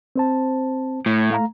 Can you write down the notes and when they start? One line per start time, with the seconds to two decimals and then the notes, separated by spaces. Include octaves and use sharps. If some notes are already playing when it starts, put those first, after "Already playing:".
0.16 C4 C5 A5
1.06 A2
1.30 A3 F5 A#5